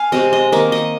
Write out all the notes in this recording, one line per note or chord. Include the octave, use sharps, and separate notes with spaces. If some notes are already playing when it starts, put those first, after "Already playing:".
Already playing: F5 G#5
C3 G#3 C4 D#5
D#5
D#3 A#3 D#5
D#5